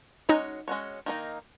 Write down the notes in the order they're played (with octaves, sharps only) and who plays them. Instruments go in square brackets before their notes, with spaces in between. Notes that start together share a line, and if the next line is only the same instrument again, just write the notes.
[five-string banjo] G#3 C#4 F#4 C#5 [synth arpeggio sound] D#4
[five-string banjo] G#3 C#4 F#4 C#5
D#3 A#3 D#4